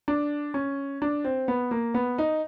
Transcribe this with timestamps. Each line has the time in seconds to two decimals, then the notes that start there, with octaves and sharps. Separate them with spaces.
0.08 D4
0.54 C#4
1.02 D4
1.24 C4
1.48 B3
1.71 A#3
1.94 B3
2.18 D#4